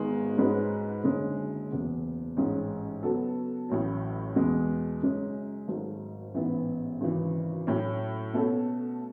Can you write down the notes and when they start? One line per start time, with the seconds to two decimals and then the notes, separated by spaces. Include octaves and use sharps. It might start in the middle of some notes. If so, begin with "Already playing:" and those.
Already playing: G#1 G#2 G#3 B3
0.38 G#2 G#3 C#4 F#4 B4
1.04 F#1 F#2 D3 G#3 C#4
1.70 F#1 E2 C#3
2.37 A1 G#2 G#3 C#4
3.03 C#3 F#3 B3 F#4 A4
3.69 A1 A2 F#3
4.36 E2 B2 G#3
5.02 F#2 C#3 G#3 C#4
5.68 G#1 G#2 F#3 A3
6.35 A1 G#2 E3 B3 E4
7.01 G#1 F#2 C#3 E3
7.67 A2 F#3 C#4
8.33 B2 A3 C#4 F#4 A4